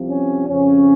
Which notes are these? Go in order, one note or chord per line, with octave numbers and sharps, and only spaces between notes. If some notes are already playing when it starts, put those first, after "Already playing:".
Already playing: C2 C3 F3
C#4
F2 C#3 F3 C#4